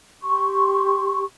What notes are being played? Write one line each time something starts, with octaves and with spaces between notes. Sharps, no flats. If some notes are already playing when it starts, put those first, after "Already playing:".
G4 C6 C#6